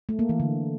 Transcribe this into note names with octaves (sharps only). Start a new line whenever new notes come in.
A3
A#3
E3
D3